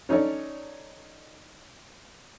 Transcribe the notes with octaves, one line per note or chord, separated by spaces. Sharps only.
C#4 D#4 A4 C#5 D5